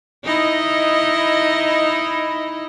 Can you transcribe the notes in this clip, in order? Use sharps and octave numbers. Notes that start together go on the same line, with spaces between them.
D#4 E4 D#5